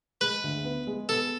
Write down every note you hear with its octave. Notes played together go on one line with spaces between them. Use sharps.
G#3 B4
D2
B3
G#3
B3 A4